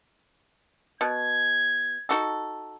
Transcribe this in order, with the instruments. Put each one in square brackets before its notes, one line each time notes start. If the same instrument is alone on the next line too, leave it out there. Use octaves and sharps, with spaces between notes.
[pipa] B2 [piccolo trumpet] G#6
[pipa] D#4 F#4 A4